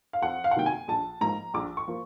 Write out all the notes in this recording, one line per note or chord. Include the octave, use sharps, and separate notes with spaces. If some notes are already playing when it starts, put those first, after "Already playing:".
F5
F2 F#5
F5
F#5
C3 D#3 F#3 A#3 G5
G#5
A#1 A5
G#2 F3 A#3 A#5
A#1 D6
C#6
F3 A#3